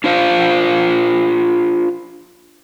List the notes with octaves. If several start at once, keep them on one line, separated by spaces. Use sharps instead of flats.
D4 F4 C5 F5